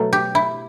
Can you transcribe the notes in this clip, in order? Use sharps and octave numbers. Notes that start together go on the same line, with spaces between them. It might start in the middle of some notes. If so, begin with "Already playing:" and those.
Already playing: B2 F#3 A3 A4
G4
E4